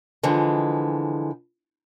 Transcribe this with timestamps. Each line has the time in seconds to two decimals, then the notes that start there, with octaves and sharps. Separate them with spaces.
0.23 D3 E3 F3 G#3